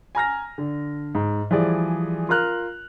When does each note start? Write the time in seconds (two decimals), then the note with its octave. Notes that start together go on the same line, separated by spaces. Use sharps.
0.15 G#5 A#5 F6 A#6
0.58 D3
1.15 G#2
1.51 E3 F3 G3 G#4 D5
2.29 F4 A#4 A#5 F6 F#6